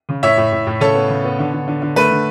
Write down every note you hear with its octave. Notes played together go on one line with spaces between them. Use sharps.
C#3
A2 C#5 E5
A2
A2
A2
C#3 A4 C#5
B3
C#3
B3
D3
D3
D3
D3
A3 B4
D3